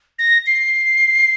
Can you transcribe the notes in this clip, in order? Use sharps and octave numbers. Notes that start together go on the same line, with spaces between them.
A#6
C7